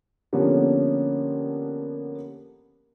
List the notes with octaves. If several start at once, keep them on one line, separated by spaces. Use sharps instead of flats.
D3 F3 A#3 B3 C#4 G4